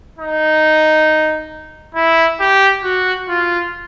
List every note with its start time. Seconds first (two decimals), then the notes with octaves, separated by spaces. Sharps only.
0.19 D#4
1.95 E4
2.40 G4
2.84 F#4
3.28 F4